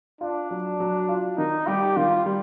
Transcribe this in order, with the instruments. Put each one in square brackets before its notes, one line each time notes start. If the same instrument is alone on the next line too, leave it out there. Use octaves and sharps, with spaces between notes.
[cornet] D4 [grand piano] F4
[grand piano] F#3
F#3
F4
[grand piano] D#3 [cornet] D#4
[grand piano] G3 [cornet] G4
[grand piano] D#3 [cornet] F4
[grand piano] G3